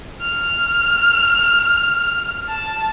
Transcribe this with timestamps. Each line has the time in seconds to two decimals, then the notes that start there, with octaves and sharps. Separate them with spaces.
0.22 F6
2.48 A5